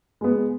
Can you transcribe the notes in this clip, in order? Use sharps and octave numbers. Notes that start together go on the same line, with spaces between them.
G#3 B3